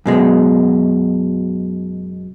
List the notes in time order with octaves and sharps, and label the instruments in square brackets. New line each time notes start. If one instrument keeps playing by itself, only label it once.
[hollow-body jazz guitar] F#2 B2 G#3